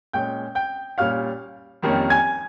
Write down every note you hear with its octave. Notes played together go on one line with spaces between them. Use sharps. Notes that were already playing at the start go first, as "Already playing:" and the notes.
A#2 G#3 C#4 G5 G6
G5 G6
A#2 G3 C#4 F5 F6
F2 D#3 G3 A#3 C#4
G#5 G#6